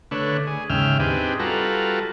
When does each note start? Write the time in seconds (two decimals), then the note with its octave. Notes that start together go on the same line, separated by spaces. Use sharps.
0.11 D3 A3 D4 B4 C#5
0.47 G#4
0.70 D#2 G#2 C#3 E5 G5 F6
1.00 C4 D4 D#4 G4 G#4 B4
1.39 G3 F4 F#4 A4 B4 A#5